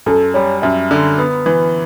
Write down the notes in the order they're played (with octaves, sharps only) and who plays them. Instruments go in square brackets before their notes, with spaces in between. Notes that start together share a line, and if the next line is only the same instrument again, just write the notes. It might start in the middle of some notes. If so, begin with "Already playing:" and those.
[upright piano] F#2 [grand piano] A4
[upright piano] G3 [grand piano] C#5
[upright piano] F#2 [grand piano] E5
[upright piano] D3
B3
E3